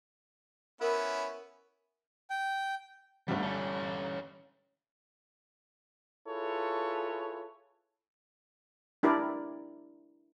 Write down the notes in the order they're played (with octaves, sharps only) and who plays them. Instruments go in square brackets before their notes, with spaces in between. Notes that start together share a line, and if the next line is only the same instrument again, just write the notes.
[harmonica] B3 C#4 E4 [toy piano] A#4
[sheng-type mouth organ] G5
[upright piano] G1 G3 [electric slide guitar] D3 A3
[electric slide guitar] C#4 A4
[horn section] E4 F4 G#4 A4 B4 C#5
[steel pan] D4 E4 G4 A#4 D5